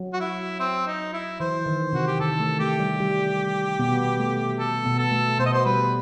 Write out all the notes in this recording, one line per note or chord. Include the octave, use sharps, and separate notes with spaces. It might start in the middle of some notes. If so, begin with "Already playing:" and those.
Already playing: F#3
F#4
E4
C4
D#4
E4
E3 C5
D#3
C3 F#4
G4
D#3 A4
A3
A3 G4
G3
G3
B2 B3
A3
A4
B2 B3
A4
A3
B2 B3 C5
D#5
C5
G3 B4